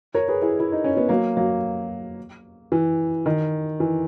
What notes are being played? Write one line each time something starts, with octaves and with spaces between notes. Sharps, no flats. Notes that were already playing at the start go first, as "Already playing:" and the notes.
A#4 C#5
G#4 B4
E4 G#4
E4
D#4
C#4
B3
F#3 A#3
F#3 A#3
E3
D#3
E3